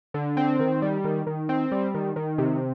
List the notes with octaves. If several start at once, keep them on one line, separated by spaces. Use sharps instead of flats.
D3
C4
D#3
G3
D#3
D#3
C4
G3
D#3
D#3
C3